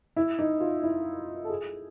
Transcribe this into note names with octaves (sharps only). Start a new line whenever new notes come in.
E4
D#4
F4
E4
A4
G#4